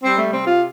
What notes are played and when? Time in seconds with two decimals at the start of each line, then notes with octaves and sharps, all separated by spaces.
0.03 G3 C4
0.18 A3
0.32 C3 C4
0.47 F4